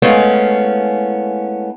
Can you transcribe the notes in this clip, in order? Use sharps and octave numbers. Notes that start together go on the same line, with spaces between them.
G#3 A3 B3 C#4 E4 F5